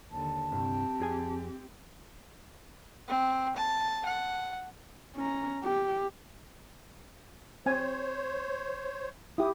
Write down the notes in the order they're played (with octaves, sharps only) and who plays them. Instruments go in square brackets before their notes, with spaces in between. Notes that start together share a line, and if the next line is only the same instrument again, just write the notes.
[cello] D#2 D3 [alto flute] A5
[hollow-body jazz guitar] C2 G2 [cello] C4 G4
[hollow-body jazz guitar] F2 G#4 G#5
[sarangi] C4
A5
F#5
[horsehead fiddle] C#4 A#5
G4
[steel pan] C4 G#5 [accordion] C5 C#5
[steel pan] E4 G4 [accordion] D#6